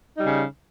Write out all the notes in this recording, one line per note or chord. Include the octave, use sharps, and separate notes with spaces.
C#3 G3 D#4